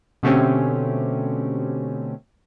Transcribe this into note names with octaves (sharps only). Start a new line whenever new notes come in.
B2 D3 A3 C4 C#4 G4